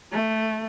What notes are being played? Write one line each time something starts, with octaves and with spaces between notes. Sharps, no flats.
A3